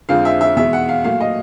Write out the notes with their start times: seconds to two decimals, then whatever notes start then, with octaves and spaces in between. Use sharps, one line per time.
0.09 F2 D3 F3 G#3 C4 F5
0.25 E5
0.41 E5
0.57 E2 B2 G#3 E5
0.73 F#5
0.89 F5
1.04 A#2 F#3 A3 F5
1.21 D#5